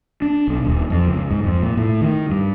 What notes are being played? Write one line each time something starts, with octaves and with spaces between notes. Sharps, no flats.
D4
B1
D#1
F2
C#2
G#2
F2
A#2
A2
D#3
G2